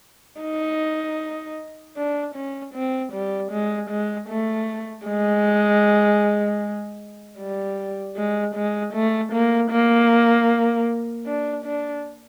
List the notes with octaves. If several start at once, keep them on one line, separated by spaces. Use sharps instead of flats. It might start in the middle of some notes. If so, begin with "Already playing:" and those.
D#4
D4
C#4
C4
G3
G#3
G#3
A3
G#3
G3
G#3
G#3
A3
A#3
A#3
D4
D4